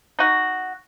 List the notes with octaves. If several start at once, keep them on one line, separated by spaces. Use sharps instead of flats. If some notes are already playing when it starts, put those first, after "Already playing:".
D#4 F#4